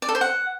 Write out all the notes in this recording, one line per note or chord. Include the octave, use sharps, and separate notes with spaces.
D5
A4
C5
F#5